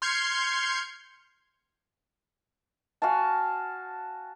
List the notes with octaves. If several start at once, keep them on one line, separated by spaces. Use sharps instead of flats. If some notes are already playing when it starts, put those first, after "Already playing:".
C6 F6 G6 G#6 C7 C#7
F#4 F5 G#5 A5